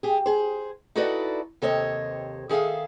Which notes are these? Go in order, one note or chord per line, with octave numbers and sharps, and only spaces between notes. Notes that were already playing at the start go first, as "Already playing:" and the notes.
G4 G#4
G#4 C5
D#4 E4 F#4 A4 B4 D5
D#2 C3 A4 C5 C#5 D#5
D#3 G#4 A4 E5 F5